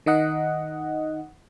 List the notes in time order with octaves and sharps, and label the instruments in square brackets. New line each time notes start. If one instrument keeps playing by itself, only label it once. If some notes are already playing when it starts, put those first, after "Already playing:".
[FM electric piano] D#3 D#4 D#5 F#5